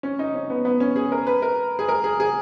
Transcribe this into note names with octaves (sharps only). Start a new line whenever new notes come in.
C#4
D#4
C#4
B3
B3
C#4
G#4
A#4
B4
A#4
G#4
A#4
G#4
G#4